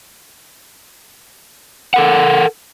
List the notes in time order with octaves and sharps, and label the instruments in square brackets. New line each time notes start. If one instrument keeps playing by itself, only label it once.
[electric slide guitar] A4 A#4 F#5